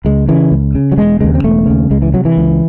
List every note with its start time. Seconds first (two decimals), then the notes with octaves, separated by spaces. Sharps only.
0.05 C#2 G#3
0.29 C#3 E3
0.51 C#2
0.75 C#3
0.92 F#3
0.97 E1 G#3
1.21 D#2 C#3 G#3
1.35 C4
1.44 E1 A3
1.67 D#2 C#3
1.91 C#2 G#3
2.02 E3
2.14 C3 F#3
2.25 E3
2.37 C#2